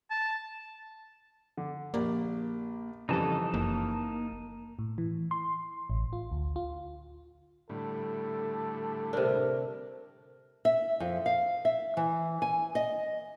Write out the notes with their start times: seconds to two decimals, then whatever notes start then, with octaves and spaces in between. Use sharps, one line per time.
0.11 A5
1.57 D3
1.94 A#1 A#3 G4 D5
3.09 F2 C#3 E3 G3 D#4 A4 A5
3.54 F#1 A#3
4.79 A2
4.98 E3
5.31 C6
5.90 A1
6.13 F4
6.32 D2
6.56 F4
7.70 A2 D3 G3 A4
9.13 C3 D4 A#4
10.65 E5
11.00 F2
11.26 F5
11.65 E5
11.97 E3
12.42 G#5
12.75 D#5